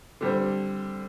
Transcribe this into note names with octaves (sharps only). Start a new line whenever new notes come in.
D3 G3 C4